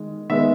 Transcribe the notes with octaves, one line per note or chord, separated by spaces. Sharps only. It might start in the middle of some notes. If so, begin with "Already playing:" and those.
Already playing: D#3 G#3
D#3 G#3 B3 E5